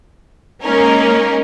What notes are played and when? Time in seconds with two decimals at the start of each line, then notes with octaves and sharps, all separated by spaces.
0.62 G#3 A#3 C#4 D#4 A#4